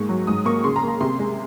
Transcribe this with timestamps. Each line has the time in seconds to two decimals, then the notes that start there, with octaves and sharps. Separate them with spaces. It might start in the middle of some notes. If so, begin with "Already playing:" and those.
Already playing: G#2 A#3 C#6
0.09 F#3
0.27 G#2 D#6
0.45 A#3 C#6
0.64 C#3 C6
0.76 A#5
0.82 A#3
0.88 A#5
1.01 C3 C6
1.19 G#3